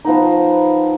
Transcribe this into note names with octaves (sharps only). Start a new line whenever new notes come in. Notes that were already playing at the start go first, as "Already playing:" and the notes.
F3 B3 D#4